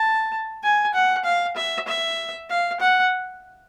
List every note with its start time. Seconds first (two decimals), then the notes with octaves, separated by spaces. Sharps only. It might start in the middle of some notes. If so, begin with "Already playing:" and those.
Already playing: A5
0.63 G#5
0.94 F#5
1.25 F5
1.56 E5
1.88 E5
2.50 F5
2.80 F#5